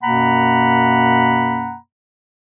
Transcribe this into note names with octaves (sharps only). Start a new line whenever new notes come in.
F#2 B2 A#3 F#5 A#5 B5